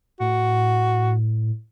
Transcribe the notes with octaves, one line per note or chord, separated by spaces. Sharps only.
A2 F#4